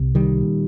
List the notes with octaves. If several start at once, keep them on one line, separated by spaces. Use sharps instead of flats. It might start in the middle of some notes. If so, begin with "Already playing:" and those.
Already playing: C2 C3
D#3 G3
A#2